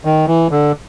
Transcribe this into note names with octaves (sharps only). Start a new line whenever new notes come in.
D#3
E3
D3